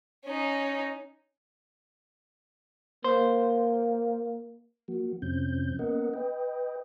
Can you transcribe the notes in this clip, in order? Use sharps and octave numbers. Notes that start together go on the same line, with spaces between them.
C#4 D#4
A#3 C5
F3 A#3 F#4
F2 C3 F3 C4 C#4 G6
A#3 B3 C#4 A#4 D#5 F#5
B4 D#5 G5